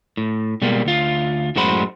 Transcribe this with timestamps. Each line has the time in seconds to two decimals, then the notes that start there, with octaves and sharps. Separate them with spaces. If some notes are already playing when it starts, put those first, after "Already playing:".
0.17 A2
0.62 B2 G3 G#3 A#3
0.85 D2 F4
1.56 F#2 A2 G#3 F#4 C5 B5